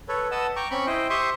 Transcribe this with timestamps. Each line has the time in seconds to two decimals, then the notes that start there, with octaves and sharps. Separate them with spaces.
0.09 A4 B4 C#5
0.31 B4 D#5 F#5 A5 E6
0.56 G5 A#5 C#6 D6
0.71 C4 C#4 B5 C#6
0.87 E4 C5 D#5 G5
1.10 G4 C5 E5 C6 C#6 D#6